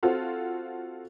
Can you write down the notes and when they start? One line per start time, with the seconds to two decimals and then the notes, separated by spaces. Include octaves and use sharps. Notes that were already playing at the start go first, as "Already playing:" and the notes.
0.03 C4 F4 F#4 A4